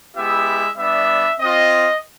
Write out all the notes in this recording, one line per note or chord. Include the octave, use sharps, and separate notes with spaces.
G#3 B3 E4 G4 E5
G3 B3 D4 E5
C4 F4 D#5